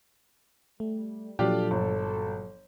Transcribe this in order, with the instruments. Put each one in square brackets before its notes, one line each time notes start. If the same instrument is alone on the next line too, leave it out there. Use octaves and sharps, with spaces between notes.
[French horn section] G3 [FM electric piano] A3
[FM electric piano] A#2 F3 F#3 [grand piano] D4 F4 G4 [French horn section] A4
[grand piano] G1